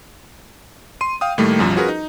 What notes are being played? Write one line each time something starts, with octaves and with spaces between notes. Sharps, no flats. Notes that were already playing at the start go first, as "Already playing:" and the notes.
C6 D#7
F5 G5 D#6
A2 D#3 G3 A3 A#3
B1 F#2 F3 G3
C#4 F4 F#4 G#4 A#4 B4
D#4